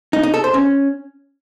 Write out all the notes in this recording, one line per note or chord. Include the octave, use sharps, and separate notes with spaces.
D#4
D#4
A4
C5
C#4